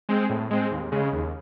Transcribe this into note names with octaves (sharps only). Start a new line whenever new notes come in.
G#3 C4
A2
G#3 C4
D#2
C#3 G#3
D#2